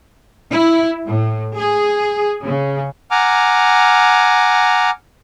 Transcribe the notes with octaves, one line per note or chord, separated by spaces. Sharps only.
E4
A2
G#4
C#3
F#5 G#5 A#5 D6 F6